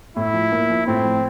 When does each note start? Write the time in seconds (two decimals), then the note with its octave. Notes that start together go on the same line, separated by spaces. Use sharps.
0.16 A2 E4
0.34 F3
0.52 A#3
0.70 F3
0.87 A2 C4
1.05 F3